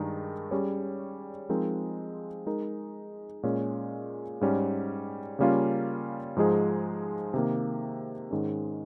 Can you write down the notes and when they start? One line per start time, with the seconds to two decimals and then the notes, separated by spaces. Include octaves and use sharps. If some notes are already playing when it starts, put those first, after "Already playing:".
Already playing: G2 D#3 G#3 D#4
0.51 G3 C#4 G#4 C#5
1.49 F3 G#3 C4 D#4 A#4
2.46 G#3 D#4 A#4
3.43 A#2 G#3 C#4
4.41 G#2 G3 C#4
5.39 C#3 G3 A#3 C#4 F4
6.36 G#2 F3 G#3 D#4 G#4
7.34 C3 D#3 A#3
8.31 G#2 D#3 G#3 C#4